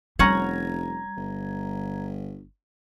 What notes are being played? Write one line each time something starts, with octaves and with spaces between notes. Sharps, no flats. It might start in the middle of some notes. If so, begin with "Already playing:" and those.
F1 G3 C#4 F#5 A#5 G#6
G1